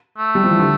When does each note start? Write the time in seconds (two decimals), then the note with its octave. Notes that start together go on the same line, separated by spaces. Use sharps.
0.18 A3
0.35 G3
0.43 F3
0.50 E3
0.59 D3